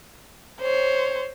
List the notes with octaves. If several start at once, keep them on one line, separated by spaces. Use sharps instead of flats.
C5 C#5